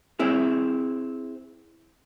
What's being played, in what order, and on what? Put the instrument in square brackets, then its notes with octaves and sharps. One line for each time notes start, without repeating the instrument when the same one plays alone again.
[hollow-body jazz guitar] C4 E4 G#4